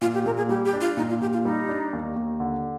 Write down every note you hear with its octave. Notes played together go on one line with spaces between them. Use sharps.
A#2 F4
G4
A#2 A#4
G#4
G3 G4
G4
D4
F4
A#2 D#4
F4
A#2 G4
F4
G3 D#4
D4
D#2
D#2
D3